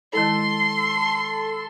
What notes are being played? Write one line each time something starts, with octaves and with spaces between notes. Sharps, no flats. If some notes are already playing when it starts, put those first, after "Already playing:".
D#3 G#3 E4 A4 C6